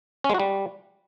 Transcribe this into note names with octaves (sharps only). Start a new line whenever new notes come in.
C#4
G#3
F#4
G3